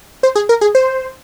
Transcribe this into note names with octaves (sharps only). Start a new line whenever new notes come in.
C5
G#4
A#4
G#4
C5